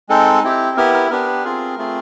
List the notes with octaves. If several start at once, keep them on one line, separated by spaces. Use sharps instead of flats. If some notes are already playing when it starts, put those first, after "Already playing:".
G#3 C4 D#4 A4
C4 E4 G4
B3 E4 G4 A#4
A#4
B3 D4 G4 A#4
C4 F4 G#4 A#4
A3 C4 F4 G#4